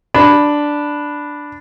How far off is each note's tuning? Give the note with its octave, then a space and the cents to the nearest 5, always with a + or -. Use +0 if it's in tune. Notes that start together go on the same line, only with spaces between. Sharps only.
D4 +0 B5 +0